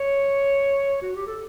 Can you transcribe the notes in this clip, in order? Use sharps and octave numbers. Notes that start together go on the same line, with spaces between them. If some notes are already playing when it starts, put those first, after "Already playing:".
Already playing: C#5
F#4
G4
A4